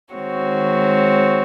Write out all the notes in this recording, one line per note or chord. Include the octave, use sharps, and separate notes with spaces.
D#3 G#3 C4 F#4 C#5